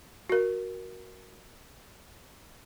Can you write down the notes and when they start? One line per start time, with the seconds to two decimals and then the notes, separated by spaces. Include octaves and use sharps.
0.30 F#4 A#4